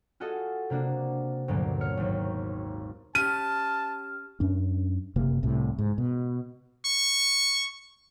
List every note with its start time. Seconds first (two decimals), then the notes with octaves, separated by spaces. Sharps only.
0.20 F4 F#4 G#4 A4 D#5
0.70 C3 A#3 D4 F#4
1.48 D2 G2 A#2 F#3 A#3 B3
1.81 C#5 F6 C#7
1.97 G#1 D#2
3.15 C#4 G4 A5 F6 D#7
4.40 F#2 C#4 D4
5.16 F#1 C3 A#3
5.43 C2 A2 C3
5.78 G#2
5.98 B2
6.85 C#6